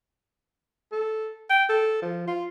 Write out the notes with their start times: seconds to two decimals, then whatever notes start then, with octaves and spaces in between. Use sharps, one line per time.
0.92 A4
1.50 G5
1.69 A4
2.02 F3
2.28 F4